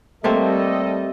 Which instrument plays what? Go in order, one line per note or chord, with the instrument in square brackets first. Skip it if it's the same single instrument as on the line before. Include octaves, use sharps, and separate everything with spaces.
[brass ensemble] G3 A4 D#5 [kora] A3 A#3 C4